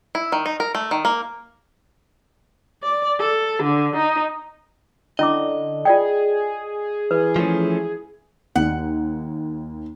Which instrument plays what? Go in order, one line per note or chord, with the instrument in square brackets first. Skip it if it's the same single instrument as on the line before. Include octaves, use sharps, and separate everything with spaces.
[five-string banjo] E4
D#3
D#4
A#4
A3
D#3
A#3
[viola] D5
A4
D3
D#4
[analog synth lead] D3 [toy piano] C#4 E4 D6 [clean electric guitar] D#5
[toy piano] F4 D5 G5 [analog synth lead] G#4
[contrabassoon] E3 [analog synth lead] G#4 [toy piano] B4
[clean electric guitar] F3 A3 C#4
[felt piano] D#2 [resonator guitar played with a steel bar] F#5